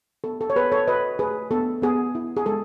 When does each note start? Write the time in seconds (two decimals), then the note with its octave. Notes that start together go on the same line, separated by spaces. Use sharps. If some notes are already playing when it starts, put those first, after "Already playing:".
0.24 B3 A4
0.41 A4
0.50 C#5
0.56 B3 G#4 B4
0.72 A4 C#5
0.87 F#4 B4 D#5
1.19 A3 G#4 B4
1.51 B3 A4
1.82 B3 G#4
2.15 E4
2.37 G#4
2.46 G#3 A4